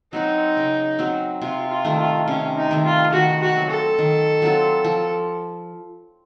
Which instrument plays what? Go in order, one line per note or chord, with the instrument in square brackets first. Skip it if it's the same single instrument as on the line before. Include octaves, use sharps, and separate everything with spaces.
[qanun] F#3 C4 F#4 [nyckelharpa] D#4
[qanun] C#3
F#3 C4 F#4
[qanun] C3 [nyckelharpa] F4
[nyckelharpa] F4
[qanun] D#3 A3
[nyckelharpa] F4
[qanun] C3 [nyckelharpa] C#4
[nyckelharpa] D#4
[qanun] D#3 A3
[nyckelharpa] F4
[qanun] D#3 [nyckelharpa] F#4
[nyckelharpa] F#4
[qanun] F#3 C4 F4
[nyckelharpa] A4
[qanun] D#3
F#3 C4 F4
F3